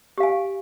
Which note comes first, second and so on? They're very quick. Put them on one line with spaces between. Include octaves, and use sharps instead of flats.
G4 F5 G#5